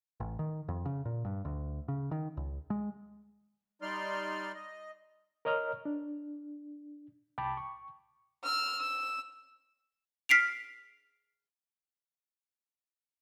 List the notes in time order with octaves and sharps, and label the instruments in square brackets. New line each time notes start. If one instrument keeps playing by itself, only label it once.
[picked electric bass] A1
D#3
F2
C#3
A#2
G2
D2
C#3
D#3
C#2
G#3
[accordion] G3 D#4 D5 C6 F6
D#5
[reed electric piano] A#4 C#5 D#5 A#5 F6
D4
C2 G5 A5 B5 D6
C#6
[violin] E6 F6
E6
[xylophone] F6 B6 C7 D7 F7